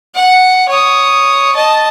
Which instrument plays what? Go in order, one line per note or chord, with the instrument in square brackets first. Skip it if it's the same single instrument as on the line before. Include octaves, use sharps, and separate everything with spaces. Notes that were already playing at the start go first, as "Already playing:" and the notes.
[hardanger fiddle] F#5
C#5 D#6
D#5 A5